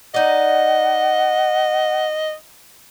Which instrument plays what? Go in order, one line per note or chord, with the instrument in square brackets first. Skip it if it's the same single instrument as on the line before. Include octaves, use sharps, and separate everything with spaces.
[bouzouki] D#4 D5 [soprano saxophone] D#5 [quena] F#5